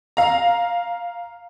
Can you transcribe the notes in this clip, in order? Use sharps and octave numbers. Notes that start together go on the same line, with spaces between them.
F5 A#5